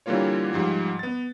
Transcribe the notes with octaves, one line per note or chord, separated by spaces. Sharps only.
D3 E3 G3 A#3 F4 C#5
G#2 F3 G3
B3 A6